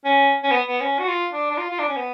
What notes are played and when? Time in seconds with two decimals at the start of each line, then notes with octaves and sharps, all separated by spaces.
0.05 C#4
0.43 C#4
0.51 B3
0.68 B3
0.81 C#4
0.99 F#4
1.08 F4
1.32 D4
1.50 D4
1.57 F4
1.70 F4
1.79 D4
1.88 C#4
1.96 B3